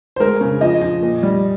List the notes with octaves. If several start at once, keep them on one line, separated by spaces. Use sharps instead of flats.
C5
G#3 A#4
C#3
F3 D#5
F3
A#2
G3